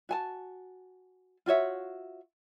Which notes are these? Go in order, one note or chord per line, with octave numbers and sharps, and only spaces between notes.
F#4 G#5 A5
F4 F#4 C#5 E5